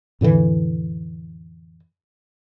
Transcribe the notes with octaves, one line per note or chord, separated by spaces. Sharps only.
F2 A2 D3 E3